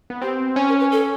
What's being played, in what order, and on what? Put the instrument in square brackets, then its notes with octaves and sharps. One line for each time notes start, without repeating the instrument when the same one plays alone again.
[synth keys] B3
[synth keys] C4 [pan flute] G4
[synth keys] C#4
[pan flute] A#4
B4
A4